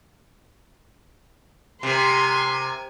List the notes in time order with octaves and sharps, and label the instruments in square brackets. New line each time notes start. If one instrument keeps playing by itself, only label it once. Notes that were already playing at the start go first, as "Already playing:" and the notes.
[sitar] C3 [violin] A#4 G#5 [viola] C6